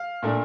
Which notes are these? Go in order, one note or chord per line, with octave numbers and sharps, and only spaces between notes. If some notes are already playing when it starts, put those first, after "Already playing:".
Already playing: F5
A#2 A3 D4